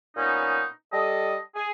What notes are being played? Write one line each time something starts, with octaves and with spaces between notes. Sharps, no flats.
A#2 B3 C#4 D#4
G3 A4 D#5
G#4